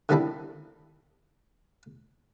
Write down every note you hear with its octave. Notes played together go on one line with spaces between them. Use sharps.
D3 D#3 G3 C4 D4 E4